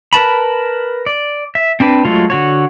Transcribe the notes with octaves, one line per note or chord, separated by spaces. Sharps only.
A#4 B4 A5 B5
D5
E5
C4 D4 B4
F#3 G#3 A3 F4
D3 F#4 C#5